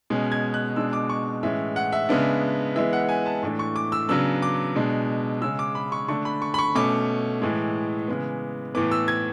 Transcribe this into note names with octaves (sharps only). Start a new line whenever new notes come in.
B2 G#3 C#4
G#6
F#6
B2 G#3 D4 E6
D6
C#6
A2 E3 G#3 C#4 E5
F#5
E5
C#3 G#3 B3 D4
E3 G#3 B3 E5
F#5
G#5
A5
A2 E3 A3 D4
C#6
D6
E6
C#3 F#3 B3 D4 E6
D6
B2 G#3 D4
C#3 G#3 C#4 E6
D6
B5
C#6
D3 A3 D4 C#6
B5
C#6
B5
C#6
B2 A3 C#4 D6
A2 E3 G#3
C#3 E3 G#3 B3
A2 E3 B3 D6
E6
G#6